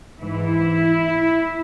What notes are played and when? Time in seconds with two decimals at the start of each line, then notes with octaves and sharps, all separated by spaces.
0.21 G#2 E3 E4